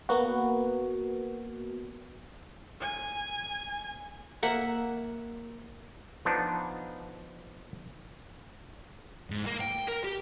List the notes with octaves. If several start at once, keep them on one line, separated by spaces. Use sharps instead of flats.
A#3 B3 F#4
G#5
A#3 E5 F#5
F3 B3 D4 D#4
G#2
A#3
G5
A#4
G4